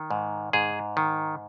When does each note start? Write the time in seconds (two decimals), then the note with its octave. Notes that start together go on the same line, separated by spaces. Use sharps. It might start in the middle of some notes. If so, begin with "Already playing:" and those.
Already playing: D#3
0.11 G#2
0.53 G#2 G#4
0.97 D#3